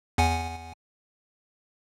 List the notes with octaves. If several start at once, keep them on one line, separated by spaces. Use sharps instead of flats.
E2 F#5 G#5